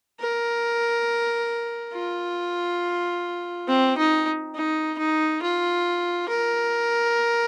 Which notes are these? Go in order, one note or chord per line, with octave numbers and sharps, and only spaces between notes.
A#4
F4
C4
D#4
D#4
D#4
F4
A#4